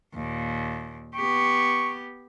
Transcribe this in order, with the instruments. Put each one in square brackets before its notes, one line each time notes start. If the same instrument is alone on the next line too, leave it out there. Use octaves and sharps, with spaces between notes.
[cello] D#2 A#2
[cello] B3 G4 [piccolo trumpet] C#6